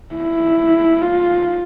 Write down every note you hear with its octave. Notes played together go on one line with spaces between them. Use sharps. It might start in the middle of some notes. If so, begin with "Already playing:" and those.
E4
F4